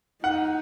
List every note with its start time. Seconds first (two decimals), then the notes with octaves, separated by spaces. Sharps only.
0.24 D#4 F#5